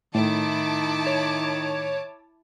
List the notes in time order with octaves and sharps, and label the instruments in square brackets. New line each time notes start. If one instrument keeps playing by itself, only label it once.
[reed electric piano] A2 [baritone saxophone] D#3 [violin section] E4 A5 D6
[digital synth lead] C#5